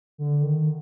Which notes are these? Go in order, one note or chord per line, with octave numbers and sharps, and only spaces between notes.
D3
D#3